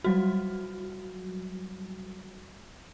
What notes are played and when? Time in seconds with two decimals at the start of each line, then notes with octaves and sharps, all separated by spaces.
0.04 F#3 G3 F#4